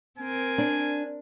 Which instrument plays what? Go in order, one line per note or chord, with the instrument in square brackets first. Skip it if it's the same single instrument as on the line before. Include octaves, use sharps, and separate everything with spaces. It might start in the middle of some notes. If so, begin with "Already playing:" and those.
[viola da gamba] C4 A#4 [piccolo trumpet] G#5
[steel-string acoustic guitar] D4